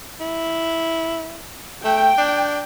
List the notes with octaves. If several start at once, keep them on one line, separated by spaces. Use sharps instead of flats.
E4
A3 G5
D4